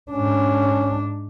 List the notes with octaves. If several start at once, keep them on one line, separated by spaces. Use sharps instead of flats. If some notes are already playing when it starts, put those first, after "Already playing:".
G#2 C#4 D4